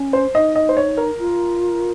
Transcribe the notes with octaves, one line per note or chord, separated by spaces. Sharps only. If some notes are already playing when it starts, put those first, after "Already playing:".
Already playing: C#4
C5
D#4 D#5
D#5
C5
C#5
A#4
F4